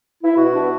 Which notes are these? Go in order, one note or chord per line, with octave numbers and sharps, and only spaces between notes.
E4
B2 F#4
G3 B3 D4